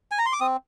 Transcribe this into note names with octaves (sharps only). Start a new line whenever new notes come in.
G#5
A#5
C6
D6
C4 D#6